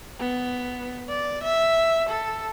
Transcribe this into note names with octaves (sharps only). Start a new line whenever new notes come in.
B3
D5
E5
A4